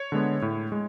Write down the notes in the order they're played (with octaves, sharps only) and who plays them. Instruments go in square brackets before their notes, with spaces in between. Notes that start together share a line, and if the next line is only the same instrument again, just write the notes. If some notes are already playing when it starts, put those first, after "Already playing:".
Already playing: [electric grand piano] C#5
D3 G#3 B3
A2
G#3